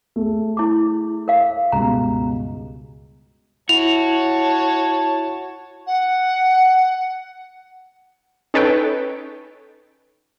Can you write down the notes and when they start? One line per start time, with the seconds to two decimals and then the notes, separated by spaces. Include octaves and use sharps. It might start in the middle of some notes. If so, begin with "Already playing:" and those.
0.16 A3 G#4
0.57 E4 D6
1.28 A#4 F5
1.72 C#2 G2 B2 A#5
3.69 E4 F#4 C#5 A5 F7
5.87 F#5
8.54 C#4 D#4 A4 B4 C#5 G5